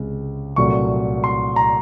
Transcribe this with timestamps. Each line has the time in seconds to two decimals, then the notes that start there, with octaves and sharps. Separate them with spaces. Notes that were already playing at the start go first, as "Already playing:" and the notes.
Already playing: C#2 C3 G#3
0.56 C2 A#2 F#3 A3 C#6
1.24 C6
1.56 A#5